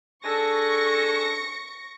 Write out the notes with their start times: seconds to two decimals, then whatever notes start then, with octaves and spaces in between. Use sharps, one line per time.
0.25 D4 G#4 A4 C#6 A#6 C#7